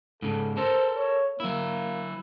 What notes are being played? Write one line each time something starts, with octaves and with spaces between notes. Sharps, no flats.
G#2 C#3 A4
A4 A#4 C5 A5
C#5
F#3 A#3 E4